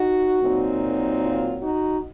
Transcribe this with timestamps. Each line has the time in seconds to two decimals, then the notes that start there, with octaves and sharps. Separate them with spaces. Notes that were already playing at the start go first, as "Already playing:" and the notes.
Already playing: D#4 F#4
0.40 A#2 F#3 C4 D#4
1.21 F4
1.62 D#4 F#4